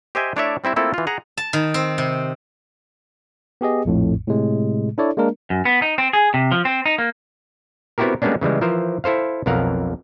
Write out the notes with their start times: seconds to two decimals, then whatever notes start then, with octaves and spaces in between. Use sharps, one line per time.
0.15 G4 C5 D#5 E5 G5 G#5
0.36 A3 D4 E4 C#5 D5 E5
0.64 G3 C4 E4 E5
0.76 A3 A#3 C4 E4 F4 A4
0.94 E3 F4
1.07 G#4 F#5 A#5
1.37 A5
1.53 D#3
1.74 C4
1.98 C3
3.61 B3 G4 G#4 D#5
3.85 A#1 F2 A2
4.28 A2 C3 G#3
4.98 D4 E4 A4 C#5 D5
5.17 G#3 A#3 D4 A#4
5.50 F#2
5.65 B3
5.82 D#4
5.98 C4
6.13 G#4
6.34 C3
6.52 F3
6.65 C4
6.86 D#4
6.98 A#3
7.98 B3 C4 E4 F#4 G4 A#4
8.22 G3 G#3 A#3 B3 C#4 D4
8.41 C#3 E3 G3 G#3
8.61 E3 F3 A#4 C5
9.04 E4 A4 C5 F5
9.46 B1 F2 A#4 F5 F#5